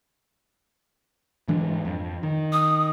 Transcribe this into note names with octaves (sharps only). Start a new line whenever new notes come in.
G#2 E3 D4
F2
D#3
D#6